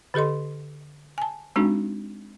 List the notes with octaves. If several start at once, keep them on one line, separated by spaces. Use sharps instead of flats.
D3 G4 A4 D#5 C6
G#5 A5
G#3 C4 D4 D#4 F#4